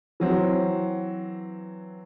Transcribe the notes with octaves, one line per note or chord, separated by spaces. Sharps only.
E3 F#3 C4